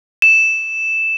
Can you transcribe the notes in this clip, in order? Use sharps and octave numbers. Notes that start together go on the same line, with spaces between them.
E7